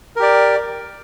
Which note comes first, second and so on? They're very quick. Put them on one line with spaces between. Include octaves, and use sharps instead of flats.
A#4 G4 D5